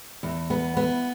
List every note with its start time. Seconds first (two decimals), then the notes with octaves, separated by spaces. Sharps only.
0.23 E2
0.50 B3
0.77 B3